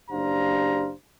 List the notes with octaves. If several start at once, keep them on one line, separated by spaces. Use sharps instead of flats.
F#1 D4 G4 C5 F5 A#5